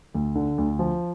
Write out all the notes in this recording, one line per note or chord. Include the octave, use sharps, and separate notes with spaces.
D2
D3
D2
F3